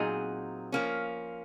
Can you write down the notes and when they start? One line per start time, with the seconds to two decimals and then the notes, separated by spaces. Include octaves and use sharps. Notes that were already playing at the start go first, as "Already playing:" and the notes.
Already playing: A#2 F#3 C4 D#4 G#4
0.72 F3 A#3 C#4